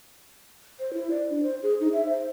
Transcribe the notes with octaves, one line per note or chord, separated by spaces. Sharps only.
C5
E4
D5
D4
C5
G#4
D#4
E5
C5